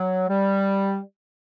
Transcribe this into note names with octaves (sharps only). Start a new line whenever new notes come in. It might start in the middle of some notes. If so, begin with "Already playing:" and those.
Already playing: F#3
G3